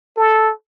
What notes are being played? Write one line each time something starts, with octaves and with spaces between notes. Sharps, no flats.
A4